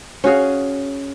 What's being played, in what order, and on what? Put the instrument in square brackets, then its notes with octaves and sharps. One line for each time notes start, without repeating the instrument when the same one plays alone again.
[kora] C#4 F#4 G#4 F5